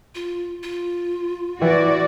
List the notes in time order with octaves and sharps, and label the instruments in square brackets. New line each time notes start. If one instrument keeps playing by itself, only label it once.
[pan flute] F4
F4
[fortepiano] E3 [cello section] F#4 D5